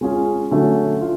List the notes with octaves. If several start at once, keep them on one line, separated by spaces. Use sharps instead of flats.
G#3 C#4 F4 G#4
D3 F#3 A3 C#4 F#4
F4